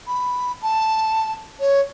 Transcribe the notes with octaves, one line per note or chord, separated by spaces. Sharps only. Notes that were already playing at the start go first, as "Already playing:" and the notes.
B5
A5
C#5